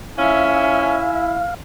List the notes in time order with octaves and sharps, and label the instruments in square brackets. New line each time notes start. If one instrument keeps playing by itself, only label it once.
[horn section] F3 A3 C#4 [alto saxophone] E4 [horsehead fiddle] E5 G#5 [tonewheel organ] F5